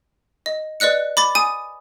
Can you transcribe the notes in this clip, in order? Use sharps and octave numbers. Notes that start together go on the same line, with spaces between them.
D#5
B4 D5 D#5 F#6 C#7
B5 D6 A6
G#5 D#6 D#7